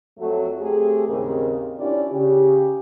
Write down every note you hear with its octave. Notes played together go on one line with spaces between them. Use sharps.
F2 F#3 A3
A3 C4 G4 G#4
D#2 G#2 C#3 C4 D#4 A#4
C#4 D4 E4 F4 G4 D5
C#3 G4